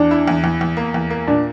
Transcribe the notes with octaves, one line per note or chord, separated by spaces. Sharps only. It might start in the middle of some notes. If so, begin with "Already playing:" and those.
Already playing: E2 D4
E4
E2
E2
E2
A#3
E2
A#3
A#2 D4